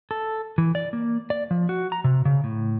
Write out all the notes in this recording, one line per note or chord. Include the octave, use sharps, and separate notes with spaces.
A4
E3
D5
A#3
D5
F3
F#4
A#5
C3
C#3
A2